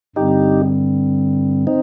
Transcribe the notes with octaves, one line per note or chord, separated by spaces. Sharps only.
G2 D3 G3 C4 D#4 G4
C4 D#4